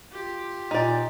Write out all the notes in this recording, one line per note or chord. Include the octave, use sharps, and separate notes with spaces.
F4 G4
A#2 D#4 D5